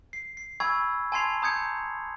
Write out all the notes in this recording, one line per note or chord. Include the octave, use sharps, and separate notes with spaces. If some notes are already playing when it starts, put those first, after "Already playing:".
C7
C7
G#5 B5 C#6 E6 G#6
G#5 A5 C6 G#6 C7 F7
A#5 D#6 G6 G#6 C#7